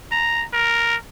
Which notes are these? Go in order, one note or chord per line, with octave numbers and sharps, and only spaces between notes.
A#5
A#4